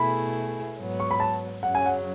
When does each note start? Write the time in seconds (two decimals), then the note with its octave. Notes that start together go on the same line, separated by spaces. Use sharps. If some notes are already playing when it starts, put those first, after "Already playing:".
Already playing: B2 A3 E4 G#4 B5
0.78 G#2 F#3 B3
1.00 C#6
1.11 B5
1.20 A5
1.63 F#2 C#3 F#3 F#5
1.75 G#5
1.86 F#5